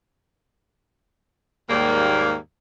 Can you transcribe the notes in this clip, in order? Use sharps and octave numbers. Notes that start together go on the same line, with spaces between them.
D#2 G#2 G3 A#3